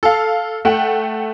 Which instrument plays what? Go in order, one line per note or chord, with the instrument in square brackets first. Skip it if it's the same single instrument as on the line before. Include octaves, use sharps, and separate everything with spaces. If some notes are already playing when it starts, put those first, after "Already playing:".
[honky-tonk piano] A4 F5
A3 F#5 G5